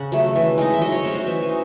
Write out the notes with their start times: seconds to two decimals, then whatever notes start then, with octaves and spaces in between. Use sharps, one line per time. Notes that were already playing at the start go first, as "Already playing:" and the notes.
Already playing: C#3 F#5
0.12 F#3 A3
0.36 E3
0.58 G#3 D#4
0.74 E5
0.81 F#3 D#5
0.92 C#5
1.04 A3 C#4 C5
1.15 F#4
1.27 E3 E5
1.42 G#5
1.49 D#4